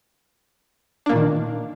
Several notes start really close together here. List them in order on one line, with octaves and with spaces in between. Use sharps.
D4 A#3 A#2 D#3